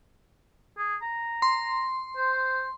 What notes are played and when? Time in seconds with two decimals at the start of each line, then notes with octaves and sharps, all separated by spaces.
0.78 G#4
1.02 A#5
1.42 C6
2.16 C5